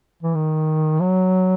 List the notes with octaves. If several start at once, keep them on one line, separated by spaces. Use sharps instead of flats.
E3
D#3
F#3